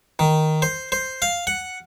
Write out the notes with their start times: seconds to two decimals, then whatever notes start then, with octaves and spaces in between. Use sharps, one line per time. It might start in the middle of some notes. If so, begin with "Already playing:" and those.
0.19 D#3
0.62 C5
0.92 C5
1.22 F5
1.47 F#5